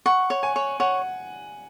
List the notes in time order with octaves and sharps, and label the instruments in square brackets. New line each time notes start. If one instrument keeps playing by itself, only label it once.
[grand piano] F#5 [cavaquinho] C#6
[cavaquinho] C#5
[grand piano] G#5
[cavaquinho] C#5
[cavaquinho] C#5 [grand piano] F#5